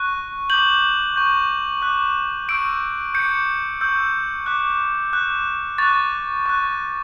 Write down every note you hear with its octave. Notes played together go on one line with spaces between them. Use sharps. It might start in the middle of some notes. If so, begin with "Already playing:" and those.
Already playing: C#6 F#6
D6 G6 F#7
C#6 G6
D6 F#6
C#6 E6 G6 D7
D6 G6 C#7
C#6 E6 G6
D6 F#6
D6 F#6
C#6 F#6 A6
C#6 F#6